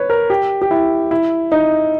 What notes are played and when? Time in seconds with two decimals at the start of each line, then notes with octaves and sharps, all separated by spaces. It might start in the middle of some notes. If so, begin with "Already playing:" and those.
Already playing: B4 C#5
0.10 A#4
0.30 G4
0.62 G4
0.71 E4
1.11 E4
1.52 D#4